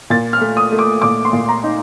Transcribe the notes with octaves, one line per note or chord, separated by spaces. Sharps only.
A#2 A6
F6
A3
D#6
A3
D6
A#2 D6
C6
A#2
A#5
D#4